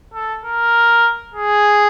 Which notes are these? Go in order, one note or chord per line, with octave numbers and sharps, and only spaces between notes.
A4
A#4
G#4